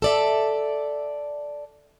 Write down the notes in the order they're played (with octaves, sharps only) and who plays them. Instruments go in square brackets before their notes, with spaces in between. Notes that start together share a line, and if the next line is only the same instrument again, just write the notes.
[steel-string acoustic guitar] A4 D5 E5